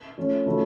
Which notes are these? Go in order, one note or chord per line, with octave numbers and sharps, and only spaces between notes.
F3 A3 C#4
C#3 F3 A3 C#4 F#4